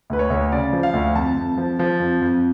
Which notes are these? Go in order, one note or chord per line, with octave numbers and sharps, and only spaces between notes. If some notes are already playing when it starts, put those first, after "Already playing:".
D2 B4
C#5
D2
C#3 D5
F3
F5
D2
F2 A5
F2
F3
F3
F2
F2